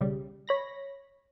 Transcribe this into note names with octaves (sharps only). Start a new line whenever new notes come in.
B1 C#3 G3
C#5 B5 A#6